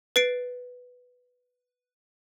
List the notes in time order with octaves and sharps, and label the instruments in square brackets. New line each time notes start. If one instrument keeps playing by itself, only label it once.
[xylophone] B4 A6 C7 D7